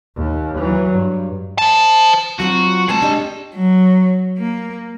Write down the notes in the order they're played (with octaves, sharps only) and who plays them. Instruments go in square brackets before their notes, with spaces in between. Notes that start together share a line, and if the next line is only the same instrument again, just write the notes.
[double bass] D#2
E3 F#3
G2
[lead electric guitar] C5 A5
[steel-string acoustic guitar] F#3 C4 F4 [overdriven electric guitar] F#4
[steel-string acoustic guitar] G#3 C4 [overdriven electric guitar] G#4 A5
[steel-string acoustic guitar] D4 G4 D#5
[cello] F#3
A#3